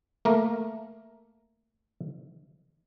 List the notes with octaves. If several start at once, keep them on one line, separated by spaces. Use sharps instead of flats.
A3 A#3 A#4